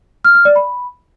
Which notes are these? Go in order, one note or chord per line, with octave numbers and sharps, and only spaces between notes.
F6
F6
D5
B5